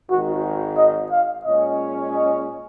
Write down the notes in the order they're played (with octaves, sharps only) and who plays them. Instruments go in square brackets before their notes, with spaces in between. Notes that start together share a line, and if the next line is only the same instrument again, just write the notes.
[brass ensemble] G#1 G#2 D#3 [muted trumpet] F#4
[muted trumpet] D#5
F5
[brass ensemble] A#2 G#3 C#4 [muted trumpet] D#5
[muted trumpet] D#5